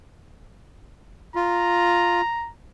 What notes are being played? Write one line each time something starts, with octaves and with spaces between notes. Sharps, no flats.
F4 A#5